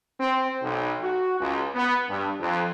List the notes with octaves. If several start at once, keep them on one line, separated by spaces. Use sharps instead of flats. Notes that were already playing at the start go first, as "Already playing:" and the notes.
C4
B1
F#4
C#2
B3
G2
F2